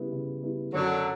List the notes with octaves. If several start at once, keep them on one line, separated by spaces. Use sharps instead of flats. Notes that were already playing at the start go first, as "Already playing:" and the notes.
Already playing: C#3 G3 B3 E4
C#3
G3 B3 E4
F#2 D3 F#3